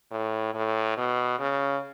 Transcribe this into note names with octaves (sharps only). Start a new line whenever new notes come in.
A2
A2
B2
C#3